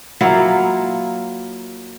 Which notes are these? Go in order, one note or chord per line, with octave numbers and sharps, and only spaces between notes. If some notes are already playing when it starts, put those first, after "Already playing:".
F#3 A#3 E4 F4